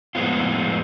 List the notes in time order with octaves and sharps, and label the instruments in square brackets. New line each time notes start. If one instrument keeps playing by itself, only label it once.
[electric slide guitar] F2 A2 G#3 B3 C4 F4